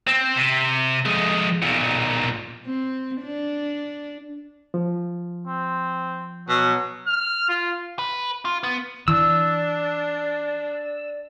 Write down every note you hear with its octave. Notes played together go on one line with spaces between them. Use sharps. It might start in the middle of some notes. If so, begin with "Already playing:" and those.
C4
C3
F2 G#3
B1 A#2
C4
D4
F3
C4
B2 F#3
F6
F4
B4
F4
B3
E3 D4 D5 E6